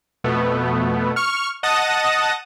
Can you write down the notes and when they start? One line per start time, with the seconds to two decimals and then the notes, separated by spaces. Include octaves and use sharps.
0.24 F2 B2 A3 B3
1.16 C#6 F6
1.63 D#5 F#5 A5 D#6 A#6